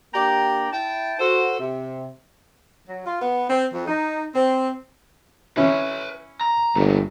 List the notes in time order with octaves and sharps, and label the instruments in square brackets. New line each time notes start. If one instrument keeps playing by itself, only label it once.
[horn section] A#3 D4 G4 D5 G5 A#5
E4 G5 A5
F#4 A4 C5
C3
[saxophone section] F#3
F4
B3
C4
F2
D#4
C4
[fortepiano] C#4 E4 [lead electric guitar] B4 C#5
[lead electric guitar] A#5
[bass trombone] G1 [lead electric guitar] A#2 A3